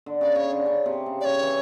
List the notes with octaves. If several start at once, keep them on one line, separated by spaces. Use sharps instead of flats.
D3
C#3 D5
C#3 C#5
D3
C#3
C3
C#3
D5
C#3 C#5
E3